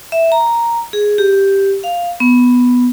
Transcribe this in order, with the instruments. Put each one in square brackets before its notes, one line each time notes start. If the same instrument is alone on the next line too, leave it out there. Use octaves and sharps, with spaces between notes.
[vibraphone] E5
A#5
G#4
G4
F5
B3